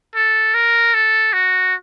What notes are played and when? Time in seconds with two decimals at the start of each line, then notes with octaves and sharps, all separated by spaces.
0.15 A4
0.54 A#4
0.94 A4
1.33 F#4